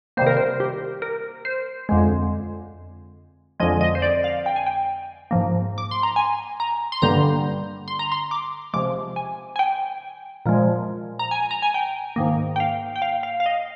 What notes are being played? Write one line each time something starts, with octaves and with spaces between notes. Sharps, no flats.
C3 D#3 G3 A#3 C5
A#4
C5
G4
A#4
C5
F2 D3 G#3
F2 D3 F3 G#3 D#5
D#5
C5
D5
F5
G5
G#5
G5
G#2 F3 A#3
D6
C6
A#5
G#5
A#5
C6
G2 D3 G3 A#3 A#5
C6
A#5
C6
D6
C3 F3 G#3 D6
G#5
G#5
G5
A#2 F3 G#3
A#5
G#5
A#5
G#5
G5
G#2 D#3 A#3
G5
F5
G5
F5
F5
F5
D#5